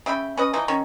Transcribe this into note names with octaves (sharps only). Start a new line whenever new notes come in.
C#3 E5 G5 B5
C#4 B4 D#5
E3 F3 D#4
D#3 C#4 C#5